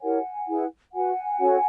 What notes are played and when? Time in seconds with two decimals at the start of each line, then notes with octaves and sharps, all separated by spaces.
0.01 E4 G4 A#4 C#5 F#5 G#5
0.47 E4 G#4 B4
0.93 F#4 B4 F#5 G#5
1.39 C#4 F#4 A4 C#5